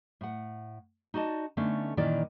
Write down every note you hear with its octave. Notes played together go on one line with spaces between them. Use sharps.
A2 F#5
D#4 F#4 D5 D#5 A5
D3 A3 B3 C#4 D#4
A#2 D#3 E3 C#4 E4 D5